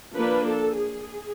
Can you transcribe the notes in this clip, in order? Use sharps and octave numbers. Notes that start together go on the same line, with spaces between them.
F3 A#3 D4 B4
A4
G#4